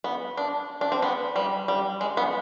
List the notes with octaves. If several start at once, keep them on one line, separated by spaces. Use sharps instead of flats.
B3
D4
D4
C4
B3
G3
G3
G#3
B3